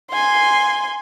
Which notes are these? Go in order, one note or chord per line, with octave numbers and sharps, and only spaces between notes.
G#5 C6